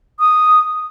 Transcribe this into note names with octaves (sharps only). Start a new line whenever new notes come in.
D#6